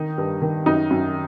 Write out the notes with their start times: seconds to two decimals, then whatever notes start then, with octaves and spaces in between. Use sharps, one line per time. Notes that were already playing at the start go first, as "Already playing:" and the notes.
Already playing: D#3 D#4
0.18 G2
0.42 D#3
0.66 F#2 D#4
0.91 F#2